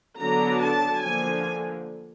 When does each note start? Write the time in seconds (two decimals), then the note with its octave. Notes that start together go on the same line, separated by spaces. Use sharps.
0.19 D3 F#3 B3 D4 A#5
0.62 A5
1.03 D3 F3 A#3 G#5